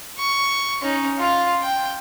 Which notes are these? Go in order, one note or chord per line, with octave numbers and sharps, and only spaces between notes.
C#6
C#4 D#4
F4 F5
G5